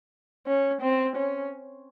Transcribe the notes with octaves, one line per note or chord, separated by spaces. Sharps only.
C#4
C4
C#4